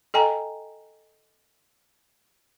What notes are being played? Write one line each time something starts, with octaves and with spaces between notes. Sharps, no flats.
A4 D#5 G5 G#5 A#5